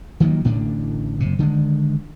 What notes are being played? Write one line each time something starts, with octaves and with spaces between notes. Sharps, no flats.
D#3 F3 F#3 A#3
A1 A2 D3 D4
F#1 C3
D3 D#3 G3 G#3